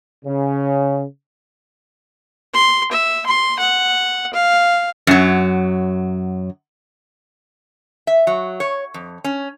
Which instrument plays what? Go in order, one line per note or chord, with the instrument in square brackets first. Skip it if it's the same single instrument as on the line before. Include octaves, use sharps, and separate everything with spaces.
[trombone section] C#3
[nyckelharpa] C6
E5
C6
F#5
F5
[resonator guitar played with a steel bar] F#2 F#3
E5
F#3
C#5
F2
C#4